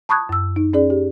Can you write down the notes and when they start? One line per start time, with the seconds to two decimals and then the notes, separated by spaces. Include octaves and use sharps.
0.09 A5 B5 C#6 D#6 F#6 G#6
0.29 F#2 E6
0.56 D#4
0.73 C#4 G#4 D5
0.90 G4